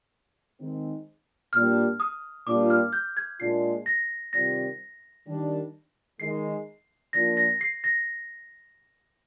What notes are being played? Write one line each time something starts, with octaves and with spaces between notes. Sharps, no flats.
D#3 G#3 C4 D#4
A#2 G3 D4 F6
D#6
A#2 G3 D4 F4 D6
F6
G6
G#6
A#2 G#3 D4 F4 C7
A#6
C3 D#3 G3 C4 F4 A#6
D#3 G3 D4
D#3 G#3 D#4 C7
F3 A#3 D4 F4 A#6
A#6
C7
A#6